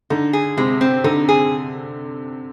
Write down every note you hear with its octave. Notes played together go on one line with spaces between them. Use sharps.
D3 D#4
G#4
C3 G#3
C4
D3 D#4
G#4